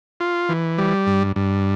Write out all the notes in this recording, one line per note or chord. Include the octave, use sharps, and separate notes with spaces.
F4
E3
G3
G2
G2